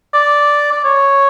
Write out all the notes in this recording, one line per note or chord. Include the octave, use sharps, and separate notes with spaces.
D5
D5
C#5